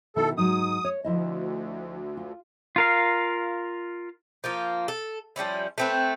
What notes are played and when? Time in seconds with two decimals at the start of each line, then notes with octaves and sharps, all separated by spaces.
0.16 B2 D#3 E4 A4
0.37 G#2 F#3 D#4 D#6
0.85 C#5
1.05 D2 F3 E4 D#5
2.17 F4
2.76 F4 A#4 F5
4.44 F3 A#3 F4
4.88 A4
5.36 F3 G3 C#4 E4
5.78 A3 C4 B4